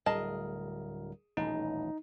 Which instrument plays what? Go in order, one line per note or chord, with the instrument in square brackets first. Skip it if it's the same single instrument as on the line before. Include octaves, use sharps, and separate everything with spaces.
[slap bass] D1 D2 G3 [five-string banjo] G#4 D#5 A5 [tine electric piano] A#4
[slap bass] D#1 A1 [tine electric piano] D#4